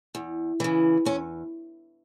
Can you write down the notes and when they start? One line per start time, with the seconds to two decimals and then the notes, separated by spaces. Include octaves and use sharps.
0.15 E2
0.60 C#3 E3
1.05 E2 C#4